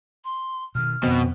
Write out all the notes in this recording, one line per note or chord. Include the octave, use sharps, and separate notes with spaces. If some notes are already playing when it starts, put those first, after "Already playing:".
C6
B2 D3 D#3 F6
F2 B2 D#3 B3 C4